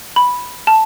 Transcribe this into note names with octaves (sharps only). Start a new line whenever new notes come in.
B5
A5